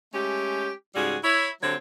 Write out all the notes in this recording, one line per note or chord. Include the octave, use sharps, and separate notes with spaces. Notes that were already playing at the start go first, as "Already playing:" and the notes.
G#3 A3 C#4 G4
G#2 C#3 G3 F#4 G#4
E4 C#5
D3 F#3 A3 C4 G4 C#5